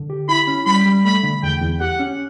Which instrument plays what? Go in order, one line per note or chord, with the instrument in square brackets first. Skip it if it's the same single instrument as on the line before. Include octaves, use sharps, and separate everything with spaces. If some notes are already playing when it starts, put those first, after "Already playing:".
Already playing: [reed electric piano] D3
G4
[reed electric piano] E4 [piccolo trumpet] B5
[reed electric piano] C#4
[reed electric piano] G3 [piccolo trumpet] B5
[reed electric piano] G3
[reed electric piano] A3 [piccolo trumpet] B5
[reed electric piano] D3
[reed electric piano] E2 [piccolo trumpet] G5
[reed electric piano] E2
[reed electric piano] G4 [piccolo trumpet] F#5
[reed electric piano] C#4